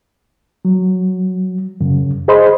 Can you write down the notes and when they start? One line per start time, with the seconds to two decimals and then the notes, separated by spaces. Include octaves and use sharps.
0.65 F#3
1.81 F#2 C#3
2.28 G#4 C5 D#5 B5 C6